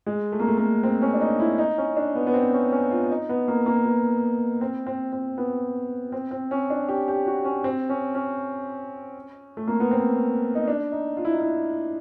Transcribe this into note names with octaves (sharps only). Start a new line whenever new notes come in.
G#3
A3
A#3
A3
A#3
C4
C#4
D4
D#4
E4
D#4
C#4
D4
B3
B3
C4
C#4
C#4
F4
D#4
B3
A#3
A#3
B3
C4
C4
C4
B3
C4
C4
C#4
D4
G4
G4
F#4
C#4
C4
C#4
C#4
A3
A#3
B3
C4
D#4
D4
D#4
F4
E4
D#4
E4